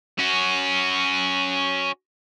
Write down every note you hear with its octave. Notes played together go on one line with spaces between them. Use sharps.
C#4 F#4